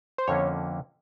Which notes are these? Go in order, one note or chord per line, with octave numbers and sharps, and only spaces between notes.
C5
F2 D3 F3 A#3 C#4 C#5